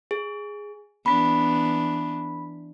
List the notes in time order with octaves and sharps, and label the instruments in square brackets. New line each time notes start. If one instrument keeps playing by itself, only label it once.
[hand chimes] G#4
[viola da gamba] E3 B3 D4 [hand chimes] B5 B6